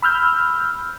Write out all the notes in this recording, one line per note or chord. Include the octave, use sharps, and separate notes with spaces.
B5 E6 F6 G6